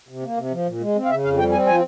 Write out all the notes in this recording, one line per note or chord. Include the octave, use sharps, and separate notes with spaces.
C3
A#3
C3
F3
A#2
G#3
C4
F5
C#3 E5
F2 F5
G3 G5
C4 G#5
F3 G#5